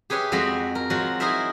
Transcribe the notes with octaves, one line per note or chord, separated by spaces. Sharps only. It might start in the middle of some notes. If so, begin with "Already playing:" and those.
G4 G#4 B4 C#5 E5
F2 G#3 F#4 C5 D#5 B5
A#4
F3 F#3 G#3 F4 F#4
D#4 E4 G#4 A#4 C5 E5